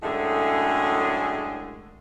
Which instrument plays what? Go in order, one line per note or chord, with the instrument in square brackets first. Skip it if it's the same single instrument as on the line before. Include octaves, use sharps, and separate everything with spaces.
[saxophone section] F#2 A2 D3 G#3 A3 G#4